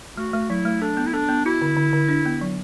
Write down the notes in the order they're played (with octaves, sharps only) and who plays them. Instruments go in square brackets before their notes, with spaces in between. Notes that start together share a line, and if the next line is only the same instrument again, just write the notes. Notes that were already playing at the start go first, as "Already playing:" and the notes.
[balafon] A3 [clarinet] F#4
[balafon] A3
[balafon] F#3 [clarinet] E4
[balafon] A3
[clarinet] D4 [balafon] A4
[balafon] B3
[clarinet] E4
[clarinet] D4 [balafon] A4
[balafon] B3
[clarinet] E4 [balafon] F#4
[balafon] D3
D3
D3
D4
B3
F#3